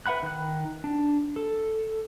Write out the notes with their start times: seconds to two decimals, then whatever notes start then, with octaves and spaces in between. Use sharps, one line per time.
0.06 B4 E5 F#5 B5 F#6
0.23 D#3 F#6
0.84 D4
1.36 A4